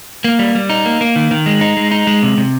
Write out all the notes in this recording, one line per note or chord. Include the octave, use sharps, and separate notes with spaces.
A#3
G3
G3
D#4
A#3
A#3
D#3
D#3
G#3
D#4
G#3
D#4
G#3
C3
C3